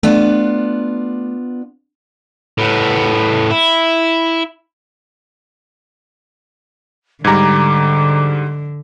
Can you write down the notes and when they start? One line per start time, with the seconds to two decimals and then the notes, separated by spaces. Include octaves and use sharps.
0.03 A3 B3 D4 F4
2.58 A2 B3
3.50 E4
7.24 G#2 D3 G3 A#5 D6 G#6